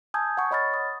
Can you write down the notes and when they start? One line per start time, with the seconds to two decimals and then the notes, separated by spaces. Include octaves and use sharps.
0.14 G#5 A5 D#6 E6 G6 G#6
0.38 F#5 C#6
0.51 C#5 D#5 B5 F6 A6
0.74 D#6